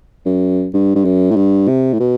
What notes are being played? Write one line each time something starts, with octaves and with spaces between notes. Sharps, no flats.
F#2
G2
G2
F#2
A2
G2
C3
A2
B2